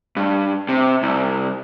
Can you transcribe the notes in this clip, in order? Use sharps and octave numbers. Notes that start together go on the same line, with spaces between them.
G2
C3
C2